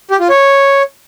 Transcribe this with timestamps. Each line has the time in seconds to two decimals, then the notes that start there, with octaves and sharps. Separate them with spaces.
0.11 G4
0.20 F4
0.29 C#5